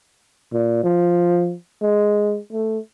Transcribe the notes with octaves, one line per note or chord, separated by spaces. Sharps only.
A#2
F3
G#3
A3